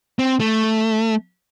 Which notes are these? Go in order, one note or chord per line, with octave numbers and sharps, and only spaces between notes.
C4
A3